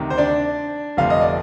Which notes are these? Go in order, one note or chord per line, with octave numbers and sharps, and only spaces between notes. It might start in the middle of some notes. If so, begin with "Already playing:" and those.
Already playing: D2 C3 D#3
C5
D4 D5
G1 F2 C3 F3 A3 F5
D#5
D5